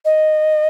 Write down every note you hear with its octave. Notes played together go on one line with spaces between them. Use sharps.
D#5